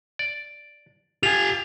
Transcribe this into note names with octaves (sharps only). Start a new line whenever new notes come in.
D5
F4 G4 G#5 F7